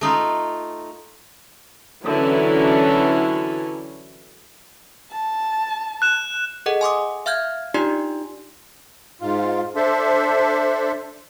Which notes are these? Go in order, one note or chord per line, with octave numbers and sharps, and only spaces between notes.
A3 D#4 F4
D3 E3 F#3 C#4 E4 A4
A5
F#6 E7
G#4 A4 D#5 F#5
G#5 C6 D6 D#6
E5 F5 F6 G6 G#6
D4 D#4 F4 G4 D5 C6
G#2 F4
D4 A4 C5 E5